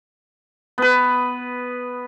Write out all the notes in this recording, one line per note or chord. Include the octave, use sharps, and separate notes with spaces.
B3 B4